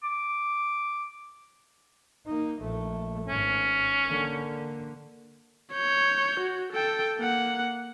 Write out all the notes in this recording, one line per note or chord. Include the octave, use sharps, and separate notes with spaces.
D6
A#3 D#4
A#1 A3
G#1 C#4
D3 A#3
C#5 G6
F#4
A4 G5
A#3 F#5